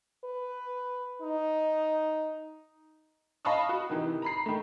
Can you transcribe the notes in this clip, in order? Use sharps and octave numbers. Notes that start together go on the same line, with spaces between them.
B4
D#4
D#5 F5 A5 B5 C#6 D#6
F#4
C3 D#3 E3 D#4
A#5 B5 C7
D#3 A3